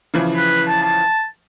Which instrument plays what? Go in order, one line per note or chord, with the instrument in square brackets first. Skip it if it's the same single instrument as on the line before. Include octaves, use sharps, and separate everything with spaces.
[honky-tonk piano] C#3 E3 F3
[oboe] B4
A5
A5